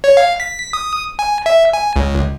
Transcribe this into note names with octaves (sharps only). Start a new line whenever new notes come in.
C#5
F5
B6
D#6
G#5
E5
G#5
C#2